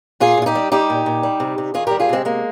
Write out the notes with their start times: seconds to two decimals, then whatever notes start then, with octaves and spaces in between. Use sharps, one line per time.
0.20 A#2 F4 G#4
0.38 A#2 F4
0.46 D#4 G4
0.55 G3
0.72 G3 D#4 G4
0.90 A#2
1.06 A#2
1.23 G3
1.40 C3
1.58 C3
1.74 D#3 F4 G#4
1.87 G3 G4 A#4
2.00 F4 G#4
2.09 C3 G#3 C4
2.25 G#3 A#3